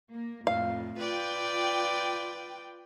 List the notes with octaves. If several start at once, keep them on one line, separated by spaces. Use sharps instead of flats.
A#3
F2 A2 F5
F4 B4 D5 G5